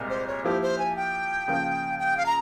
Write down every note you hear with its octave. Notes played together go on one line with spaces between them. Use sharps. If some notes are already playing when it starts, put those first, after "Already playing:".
Already playing: C2 A#2 G#3 C4
C5
C#5
F3 A#3 E4 G4 C5
C5
G#5
G5
C#3 F3 A#3 F4
G5
F5
A#5